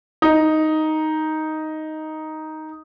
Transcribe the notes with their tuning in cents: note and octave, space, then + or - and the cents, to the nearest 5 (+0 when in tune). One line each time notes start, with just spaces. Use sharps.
D#4 +5